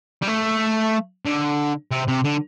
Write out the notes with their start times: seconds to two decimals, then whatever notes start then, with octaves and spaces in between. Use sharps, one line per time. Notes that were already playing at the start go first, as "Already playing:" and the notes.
0.22 G3
0.27 A3
1.25 D3
1.91 C3
2.08 C3
2.24 D3